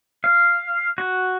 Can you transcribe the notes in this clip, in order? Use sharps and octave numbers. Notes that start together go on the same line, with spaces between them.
F5
F#4